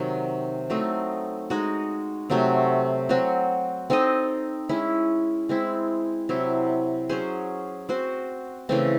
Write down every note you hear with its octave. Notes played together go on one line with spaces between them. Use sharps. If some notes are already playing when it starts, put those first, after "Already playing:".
Already playing: C3 D#3 F#3 D#4
F#3 A3 C4 D#4
G#3 D#4 F#4
C3 F#3 A3 C4
F#3 C4 F#4
C4 D#4 A4 D#5
G#3 C#4 E4
G#3 C4 E4
C3 F#3 C4 E4
F#3 C#4 G#4 C5
C4 F#4 C5
C#3 E3 A3 C4